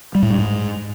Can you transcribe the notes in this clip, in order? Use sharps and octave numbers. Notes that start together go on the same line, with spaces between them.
G3
A2
G2
G#2